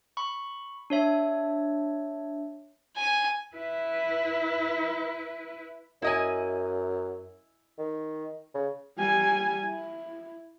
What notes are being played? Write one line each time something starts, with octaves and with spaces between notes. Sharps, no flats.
B5 C#6
D4 C#5 E5
G#5
E4 B4
F#2 E4 D#5 G#5
D#3
C#3
G3 G#5
E4